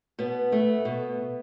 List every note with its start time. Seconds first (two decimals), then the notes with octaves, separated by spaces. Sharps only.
0.19 B2 B3
0.52 A3
0.85 B2